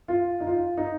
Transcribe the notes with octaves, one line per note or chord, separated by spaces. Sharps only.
F4
D#4
F4
D#4